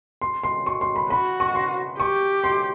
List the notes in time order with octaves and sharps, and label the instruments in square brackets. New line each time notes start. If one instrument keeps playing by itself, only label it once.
[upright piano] C6
C6
C#6
C6
B5
[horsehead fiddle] F#4 [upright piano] B5
[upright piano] C#6
C6
[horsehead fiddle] G4 [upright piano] C#6
[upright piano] C6